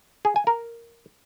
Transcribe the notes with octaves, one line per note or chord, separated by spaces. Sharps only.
G#4
G#5
A#4